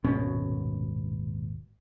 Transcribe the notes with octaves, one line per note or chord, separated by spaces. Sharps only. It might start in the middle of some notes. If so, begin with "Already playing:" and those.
D#1 G#1 B2 C#4